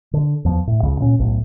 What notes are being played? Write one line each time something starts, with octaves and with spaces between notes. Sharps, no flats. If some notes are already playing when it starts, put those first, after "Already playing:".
D3
E2 F3
A2
C#2 C#3
A#2 C#4
B1 A2